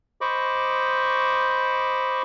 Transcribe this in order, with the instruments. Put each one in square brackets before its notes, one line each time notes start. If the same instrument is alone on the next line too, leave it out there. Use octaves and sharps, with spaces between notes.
[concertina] C5 D#5 B5 C#6 D6